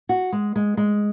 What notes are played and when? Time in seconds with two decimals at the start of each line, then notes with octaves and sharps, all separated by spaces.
0.09 F#4
0.32 G#3
0.56 G#3
0.77 G#3